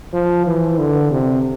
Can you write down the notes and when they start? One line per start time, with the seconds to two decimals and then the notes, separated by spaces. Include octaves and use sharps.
0.13 F3
0.47 E3
0.78 D3
1.11 C3